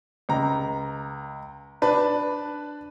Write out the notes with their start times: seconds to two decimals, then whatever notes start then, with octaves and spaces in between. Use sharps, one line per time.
0.29 C#2 A#5
1.82 D4 B4 A5